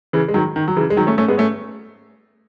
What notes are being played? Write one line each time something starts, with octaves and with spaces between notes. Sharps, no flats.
C#3 E3
G#3
D#3 F#3
D#3
F#3
C#3 E3
G#3
D#3 F#3
A3 C#4
A3 C#4
G#3 B3
A3 C#4